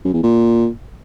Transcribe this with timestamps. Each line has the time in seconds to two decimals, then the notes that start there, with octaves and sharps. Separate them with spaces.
0.05 F#2
0.14 E2
0.23 A#2